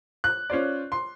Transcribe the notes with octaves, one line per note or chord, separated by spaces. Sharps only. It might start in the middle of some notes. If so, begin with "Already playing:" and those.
F#6
C#4 F4 C5 D5
C6